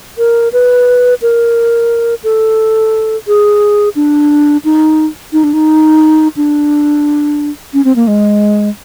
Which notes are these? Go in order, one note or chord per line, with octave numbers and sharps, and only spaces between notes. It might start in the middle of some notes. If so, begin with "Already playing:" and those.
A#4
B4
A#4
A4
G#4
D4
D#4
D#4
D4
D#4
D4
C#4
C4
A#3
G#3